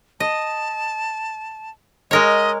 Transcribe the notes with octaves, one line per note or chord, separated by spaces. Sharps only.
D#5 A5
G#3 A#4 C#5 D#5